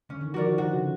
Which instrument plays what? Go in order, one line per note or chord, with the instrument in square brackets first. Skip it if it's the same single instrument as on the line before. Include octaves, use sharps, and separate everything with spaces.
[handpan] D3 [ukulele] C#4
[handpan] D#3
[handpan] F3 [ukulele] F#4 A#4 D5
[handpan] D#3
[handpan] D3 [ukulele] F#4
[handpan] C#3